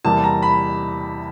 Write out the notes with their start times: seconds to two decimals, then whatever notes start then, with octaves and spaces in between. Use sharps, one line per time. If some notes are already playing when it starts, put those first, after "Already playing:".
0.05 E2 C3 E3 G3 A#3 A5
0.24 A#5
0.43 B5